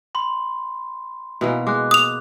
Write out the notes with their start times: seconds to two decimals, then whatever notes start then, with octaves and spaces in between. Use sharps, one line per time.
0.15 B5 C6
1.41 B2 E3 A#3
1.67 G#3 D6 F#6
1.91 D#6 F7